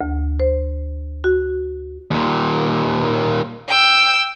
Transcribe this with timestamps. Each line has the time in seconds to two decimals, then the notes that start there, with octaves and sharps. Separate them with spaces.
0.01 D2
0.40 C5
1.24 F#4
2.11 D#2 A#2
3.69 G5 E6